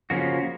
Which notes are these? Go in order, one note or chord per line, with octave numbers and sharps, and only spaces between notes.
C#3 F3 A#3 C#4 F#4